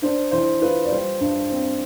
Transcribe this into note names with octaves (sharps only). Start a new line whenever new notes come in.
D4 C5
E3 C5
F4 B4
D5
G3 C5
G2
C4